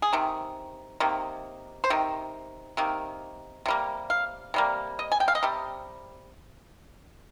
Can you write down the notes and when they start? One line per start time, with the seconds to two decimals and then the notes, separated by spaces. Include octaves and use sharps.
0.02 G#4
0.13 C3 D#3
1.00 C3 D#3 A#3
1.84 C5
1.90 C3 D#3
2.77 C3 D#3 A#3
3.66 C3 G3 A#3
4.10 F5
4.54 C3 G3 A#3
4.99 D#5
5.12 G#5
5.20 G5
5.28 F5
5.35 D#5
5.43 C3 G3